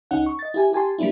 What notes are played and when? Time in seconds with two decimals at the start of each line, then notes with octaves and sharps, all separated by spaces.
0.11 C#2 C#4 D#4 F#5
0.26 C#6
0.39 D#5 A6
0.54 E4 G4 G#5
0.73 G4 G#5 A5 C6
0.98 G3 A#3 B3 D4 E4